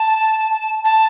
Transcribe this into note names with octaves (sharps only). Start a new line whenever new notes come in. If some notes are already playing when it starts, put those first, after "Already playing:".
Already playing: A5
A5